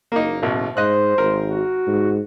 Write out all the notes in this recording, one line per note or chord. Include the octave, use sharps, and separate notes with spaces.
F#1 A#3 D#4
A1 B2
G#2 C5 D#5 F#6
G#1 A#4
F#4
G#2